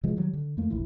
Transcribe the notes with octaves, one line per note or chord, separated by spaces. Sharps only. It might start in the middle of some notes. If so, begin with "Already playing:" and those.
C3 E3 F3 G#3
D#3 F#3 G3
D3
F2 A3 A#3
F1 A#1 E3